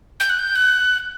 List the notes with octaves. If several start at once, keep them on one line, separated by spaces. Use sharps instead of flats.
G6
F#6
G6
F#6